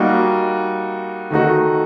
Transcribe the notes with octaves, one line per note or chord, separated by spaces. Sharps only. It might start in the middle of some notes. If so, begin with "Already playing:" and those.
Already playing: G3 A#3 D#4 F#4 A#4
D#3 A3 D#4 F#4